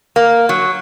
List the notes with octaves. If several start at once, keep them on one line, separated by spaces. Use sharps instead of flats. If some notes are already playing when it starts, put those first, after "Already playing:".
A#3
F#3